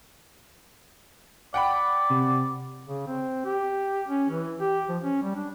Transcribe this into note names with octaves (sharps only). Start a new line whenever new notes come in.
D5 F#5 G5 B5
C3
C#3
C4
G4
C#4
E3
G4
F3
C#4
G3
D4